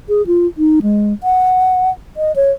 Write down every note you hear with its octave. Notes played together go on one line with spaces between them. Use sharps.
G#4
F4
D#4
G#3
F#5
D#5
C#5